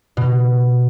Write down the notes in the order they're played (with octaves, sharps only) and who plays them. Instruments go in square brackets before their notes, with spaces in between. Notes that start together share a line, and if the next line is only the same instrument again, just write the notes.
[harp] B2